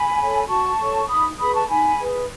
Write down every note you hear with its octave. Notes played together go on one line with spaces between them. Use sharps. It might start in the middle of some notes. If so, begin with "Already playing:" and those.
Already playing: G#5 B5
A4 C#5
F#4 A5 C#6
A4 C#5
D#4 B5 D#6
G#4 B4 B5 D#6
A5 C#6
D#4 G#5 B5
G#4 B4